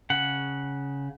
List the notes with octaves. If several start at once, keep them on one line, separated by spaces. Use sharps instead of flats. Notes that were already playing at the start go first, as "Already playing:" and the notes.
C#3 F#5